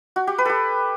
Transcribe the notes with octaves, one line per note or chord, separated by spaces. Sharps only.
F#4
G4
B4
G4 A4